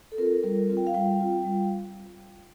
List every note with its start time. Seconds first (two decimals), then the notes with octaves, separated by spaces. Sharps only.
0.12 A4
0.18 C4 F4 A#4
0.43 G3 A#4
0.69 C4 F4
0.77 G5
0.87 F5
0.94 G3 G5
1.20 C4 F4
1.45 G3